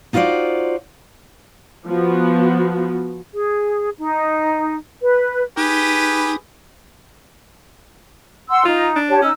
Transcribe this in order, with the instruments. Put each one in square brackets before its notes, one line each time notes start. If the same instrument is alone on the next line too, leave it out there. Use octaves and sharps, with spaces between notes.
[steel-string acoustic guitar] D#4 F4 F#4 B4 C5 D5
[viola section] F3 B3 F#4
[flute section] G#4
D#4
B4
[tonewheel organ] D#4 [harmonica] G4 G#4 B4
[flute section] F#5 C6 E6
[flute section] D#4 [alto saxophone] F4
[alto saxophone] D4
[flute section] G4 C#5 A5
[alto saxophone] C#4 [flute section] D#4 E6